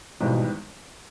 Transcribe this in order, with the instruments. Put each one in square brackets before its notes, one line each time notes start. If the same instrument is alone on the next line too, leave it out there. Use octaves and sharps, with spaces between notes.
[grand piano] G#1 G#2 E3 G3 B3 [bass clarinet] B2